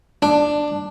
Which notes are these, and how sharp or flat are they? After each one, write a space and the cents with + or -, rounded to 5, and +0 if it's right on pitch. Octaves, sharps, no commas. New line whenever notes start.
D4 +10